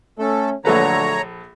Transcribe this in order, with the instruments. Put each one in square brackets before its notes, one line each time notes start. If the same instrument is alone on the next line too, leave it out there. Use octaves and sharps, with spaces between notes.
[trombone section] A3 C#4 [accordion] A4
[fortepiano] A#1 A4 B4 [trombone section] D3 F#3 A3 [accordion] C#5 A#5